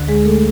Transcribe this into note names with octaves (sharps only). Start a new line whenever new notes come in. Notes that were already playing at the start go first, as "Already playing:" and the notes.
Already playing: D2 D3
G#3 G#4
A3 A4